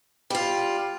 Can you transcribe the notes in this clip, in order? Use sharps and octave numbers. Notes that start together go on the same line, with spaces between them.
G3 F4